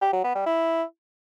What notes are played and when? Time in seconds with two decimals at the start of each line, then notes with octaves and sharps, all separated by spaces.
0.02 G4
0.13 F#3
0.24 B3
0.35 G3
0.46 E4